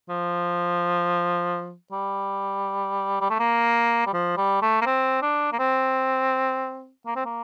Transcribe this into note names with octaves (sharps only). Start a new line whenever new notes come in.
F3
G3
G3
A3
A#3
G3
F3
G3
A3
A#3
C4
D4
A#3
C4
A#3
C4
A#3